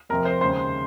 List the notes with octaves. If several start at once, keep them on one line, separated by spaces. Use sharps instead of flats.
F2 C3 F3 A#4 A#5
C5 C6
D#2 C#3 G#3 C5 C6